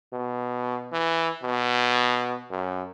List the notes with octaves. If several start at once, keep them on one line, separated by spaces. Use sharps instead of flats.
B2
E3
B2
F#2